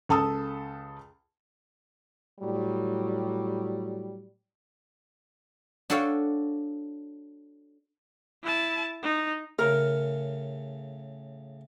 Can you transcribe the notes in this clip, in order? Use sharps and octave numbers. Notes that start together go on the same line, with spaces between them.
C#2 A4 A5 D#6 E6
A2 F#3 G3
D4 F#4 A4 C#5 F5 G5
E4 A5
D#4
A2 C#3 A#4